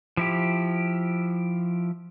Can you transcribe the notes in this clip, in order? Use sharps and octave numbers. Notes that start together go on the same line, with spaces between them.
F3 E4 G4